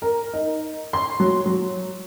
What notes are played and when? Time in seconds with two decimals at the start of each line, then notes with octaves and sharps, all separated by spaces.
0.02 A#4
0.33 D#4
0.93 C6
1.20 F#3
1.46 F#3